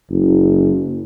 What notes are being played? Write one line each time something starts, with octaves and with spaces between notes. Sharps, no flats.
F#1